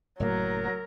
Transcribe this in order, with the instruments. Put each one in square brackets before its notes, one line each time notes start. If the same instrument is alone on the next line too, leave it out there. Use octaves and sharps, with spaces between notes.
[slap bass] F#1 A2 A#3 [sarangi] F#3 [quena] A#4